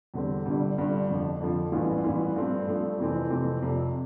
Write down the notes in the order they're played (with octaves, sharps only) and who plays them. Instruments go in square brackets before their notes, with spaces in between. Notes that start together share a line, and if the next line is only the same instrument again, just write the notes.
[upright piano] E2 D3 G3 C4
G1 G2 D3 G3
G1 G2 D3 G3
F2 D3 F3
F2 D3 F3
A1 G2 E3 B3 F4
A1 G2 E3 B3 F4
G2 F3 A3 C4
G2 F3 A3 C4
F2 C3 E3 A3 C4
F2 C3 E3 A3 C4
F1 F2 C3 F3